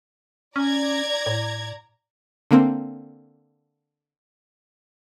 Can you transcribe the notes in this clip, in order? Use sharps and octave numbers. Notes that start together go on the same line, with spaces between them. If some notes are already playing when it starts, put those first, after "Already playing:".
C#4 D5 A#5 G#6
A2
D3 A#3 C4